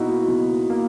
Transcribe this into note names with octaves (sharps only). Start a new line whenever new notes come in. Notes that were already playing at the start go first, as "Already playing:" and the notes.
Already playing: B2 A#3 D#4 E4 F#4
B2
A#3